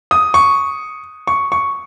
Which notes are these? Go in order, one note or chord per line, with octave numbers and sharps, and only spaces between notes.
D#6
C#6
C#6
C#6